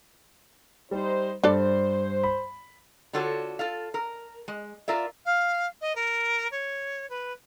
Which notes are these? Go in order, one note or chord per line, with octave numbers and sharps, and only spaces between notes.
G3 D#4 C5
G2 D4 A4 C5 D5
B5
D3 F4 F#4 A4 C#5 A5
F4 A4 F5
A#4
G#3
F4 A#4 D5 E5
F5
D#5
A#4
C#5
B4